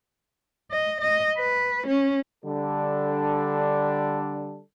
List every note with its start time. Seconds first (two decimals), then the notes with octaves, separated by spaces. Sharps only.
0.71 D#5
1.01 D#5
1.38 B4
1.87 C#4
2.45 D3 G3 D4 A4